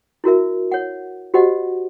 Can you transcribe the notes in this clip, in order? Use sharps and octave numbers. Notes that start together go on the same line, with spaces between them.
E4 F#4 A#4 E5
C#5 F#5
F#4 G4 C5 D#5 F#5